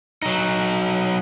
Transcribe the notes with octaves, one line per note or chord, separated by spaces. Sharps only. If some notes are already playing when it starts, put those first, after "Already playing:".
F#3 D#4